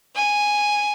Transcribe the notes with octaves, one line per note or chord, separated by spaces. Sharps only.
G#5